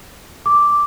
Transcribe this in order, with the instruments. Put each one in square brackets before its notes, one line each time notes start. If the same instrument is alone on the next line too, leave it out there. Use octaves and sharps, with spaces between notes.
[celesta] D6